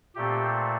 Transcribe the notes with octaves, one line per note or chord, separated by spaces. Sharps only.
A#2 A3 C4 G4